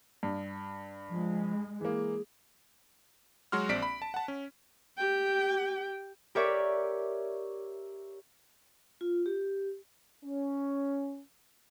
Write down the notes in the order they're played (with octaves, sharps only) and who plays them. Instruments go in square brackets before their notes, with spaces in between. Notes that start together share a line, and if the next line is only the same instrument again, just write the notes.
[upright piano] G2
[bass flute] F3 [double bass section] G#3
[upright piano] E3 A#3 [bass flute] G#4
[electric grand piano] F#3 G#3 F#4 C6 F6
A#1 C4 D5 B6 D7
B5
A5
F#5 A5
C#4
[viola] G4 G5
[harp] G4 A#4 C#5 D5 E5 C#6
[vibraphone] F4
G4
[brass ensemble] C#4